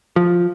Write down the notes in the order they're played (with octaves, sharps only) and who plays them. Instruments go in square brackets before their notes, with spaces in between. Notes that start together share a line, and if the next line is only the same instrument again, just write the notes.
[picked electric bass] F3